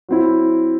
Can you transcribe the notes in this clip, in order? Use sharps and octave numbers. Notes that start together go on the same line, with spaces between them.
F#3 C4 E4